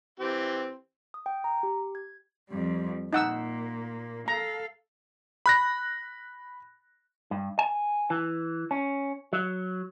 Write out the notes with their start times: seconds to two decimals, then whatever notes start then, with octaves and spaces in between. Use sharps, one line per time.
0.20 E3 C4 G4
1.14 D#6
1.26 G5
1.44 A#5
1.63 G4
1.95 G#6
2.50 F2 G3
3.13 A#2 A#3 D#4 F#5 E6
4.28 A4 F5 A#5
5.46 B5 F#6 A#6
7.31 G2
7.59 G#5
8.10 E3
8.71 C#4
9.33 F#3